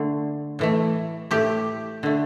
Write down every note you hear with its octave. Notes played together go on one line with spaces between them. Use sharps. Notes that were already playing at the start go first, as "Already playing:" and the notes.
Already playing: D3 A3
A2 E3 A3
A2 A3 G4
D3 A3